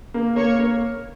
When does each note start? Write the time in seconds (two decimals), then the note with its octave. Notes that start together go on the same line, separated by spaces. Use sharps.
0.14 A#3
0.36 A#3 C#5
0.59 A#3